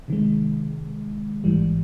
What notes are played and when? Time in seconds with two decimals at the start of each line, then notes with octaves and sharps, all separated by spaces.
0.08 C3 D#3 G#3
1.44 A1 G#2 E3 G3